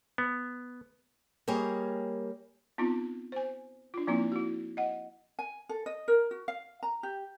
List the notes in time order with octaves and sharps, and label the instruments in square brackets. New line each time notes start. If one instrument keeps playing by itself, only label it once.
[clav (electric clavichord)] B3
[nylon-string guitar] G3 A#3 G4 G#4 C#5 D#5
[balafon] B3 C4 D#4 F4
C5 G#5
D4 F4
F3 A#3 C4 D#4 E4
E4 F#4
D#5 F#5
[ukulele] G#5
A4
D#5
A#4
F#4
F5
A#5
G4